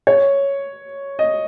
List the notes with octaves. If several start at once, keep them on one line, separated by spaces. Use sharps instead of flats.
C#5
D#5